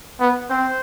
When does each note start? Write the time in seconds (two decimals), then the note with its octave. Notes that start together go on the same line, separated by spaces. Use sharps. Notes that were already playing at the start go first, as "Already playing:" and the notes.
0.20 B3
0.50 C4 C5